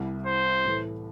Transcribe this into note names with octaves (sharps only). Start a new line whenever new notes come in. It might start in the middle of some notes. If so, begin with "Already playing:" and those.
Already playing: C2 C3 G3 E4
C5
A2 E3 A3